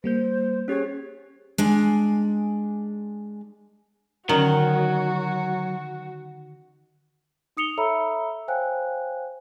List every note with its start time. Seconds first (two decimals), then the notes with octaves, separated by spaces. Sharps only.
0.04 G3 A#3 C5 G6
0.68 C#4 G4 G#4 C#5
1.58 G#3 D4 G#5
4.29 D3 D#3 F#3 C#4 F#4 A#5
7.57 D#4 D#6 C#7 F7 G7
7.77 A4 C#5 E5 A#5 B5 E6
8.48 C5 C#5 F5 G5 G#5 F#6